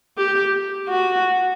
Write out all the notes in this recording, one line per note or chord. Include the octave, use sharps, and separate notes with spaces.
G4
F#4